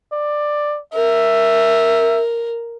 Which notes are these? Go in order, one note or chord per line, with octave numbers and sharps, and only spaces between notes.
D5
A#4 E5